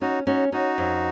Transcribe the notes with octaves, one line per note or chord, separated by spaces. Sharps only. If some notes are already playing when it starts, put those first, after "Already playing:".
C#4 D#4 F#4
C#4 D#4 F#4
C#4 D#4 F#4
F2